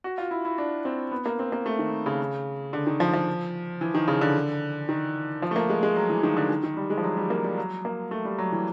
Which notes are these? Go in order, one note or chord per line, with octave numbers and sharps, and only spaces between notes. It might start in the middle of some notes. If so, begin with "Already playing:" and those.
F#4
F4
E4
E4
D4
C4
B3
A#3
C4
A#3
A3
D#3
C#3
D3
D#3
F3
F3
E3
D#3
C#3
D3
D#3
F3
A3
A#3
G#3
G#3
F#3
E3
D#3
D3
D#3
D#3
G3
G#3
F3
F#3
G3
A#3
G3
F#3
A#3
A3
G3
F#3
E3